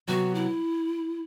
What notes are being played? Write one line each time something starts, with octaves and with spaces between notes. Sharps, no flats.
C3 F#3 B3 F#4
E4